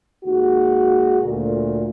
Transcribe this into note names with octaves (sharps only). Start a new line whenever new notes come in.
D#2 G#3 F#4
D2 A#2